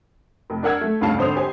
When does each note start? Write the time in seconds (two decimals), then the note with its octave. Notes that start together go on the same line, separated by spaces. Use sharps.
0.50 F1
0.63 D4 A#4 F#5 E6 G#6
0.81 A3
1.01 F1 D2 G2 C#3 F5 A5
1.18 G#1 D3 C5 D#6 F7
1.36 G4 C5 G#5